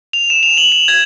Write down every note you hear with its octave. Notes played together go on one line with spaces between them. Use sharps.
F7
E7
F7
F#7
F7
G#6